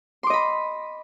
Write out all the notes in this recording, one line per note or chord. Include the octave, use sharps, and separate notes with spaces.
D#5 B5 C6 D6